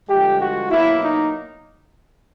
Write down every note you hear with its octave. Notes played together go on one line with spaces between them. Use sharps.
G2 D3 F3 G#3 G4
F#4
B2 F#3 A#3 E4
D#4